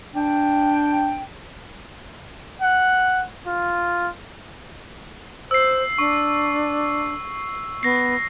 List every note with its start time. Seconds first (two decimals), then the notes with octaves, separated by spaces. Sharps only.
0.15 D4 G5
2.62 F#5
3.47 F4
5.51 C5 E6 C7
5.98 D4 C#6
7.83 B3 A#6 C7